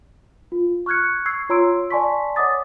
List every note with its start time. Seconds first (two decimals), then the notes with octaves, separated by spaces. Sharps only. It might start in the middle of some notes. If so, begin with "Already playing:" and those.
0.52 F4
0.86 C#6 F6 F#6 G#6 C#7
1.26 C#6 E6 G#6 C7
1.49 F4 C#5 A#5 C6 E6 D7
1.90 D5 G#5 A5 C6 C#6 B6
2.36 C#5 D#5 F#5 D6 D#6 A6